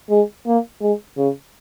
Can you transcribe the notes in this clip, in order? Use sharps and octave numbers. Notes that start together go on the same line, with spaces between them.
G#3
A#3
G#3
C#3